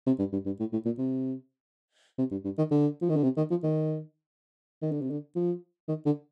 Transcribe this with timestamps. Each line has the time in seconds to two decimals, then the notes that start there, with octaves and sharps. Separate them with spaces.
0.07 C3
0.19 G2
0.32 G2
0.46 G2
0.60 A2
0.73 A2
0.86 A#2
0.99 C3
2.18 C3
2.31 G2
2.45 G2
2.58 D#3
2.71 D3
3.02 F3
3.10 D#3
3.16 D3
3.24 C3
3.37 D#3
3.50 F3
3.63 D#3
4.82 D#3
4.92 D3
5.02 C3
5.10 D3
5.36 F3
5.88 D#3
6.06 D3